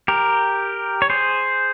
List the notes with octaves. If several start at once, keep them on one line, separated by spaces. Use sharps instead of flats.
G4 A#4
C#5
G#4 C5